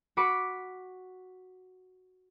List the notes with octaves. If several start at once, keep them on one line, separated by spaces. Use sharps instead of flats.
F#4 B5 D6 C#7